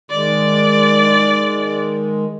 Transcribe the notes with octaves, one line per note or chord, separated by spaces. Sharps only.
D#3 G#3 D5